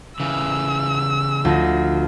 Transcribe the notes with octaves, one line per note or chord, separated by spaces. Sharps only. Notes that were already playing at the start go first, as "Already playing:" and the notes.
C#3 E3 E6
D2 F3 D#5